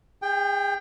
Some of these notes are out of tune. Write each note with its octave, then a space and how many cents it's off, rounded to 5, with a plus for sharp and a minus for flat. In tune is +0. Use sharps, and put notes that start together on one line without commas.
G#4 -35 G5 +10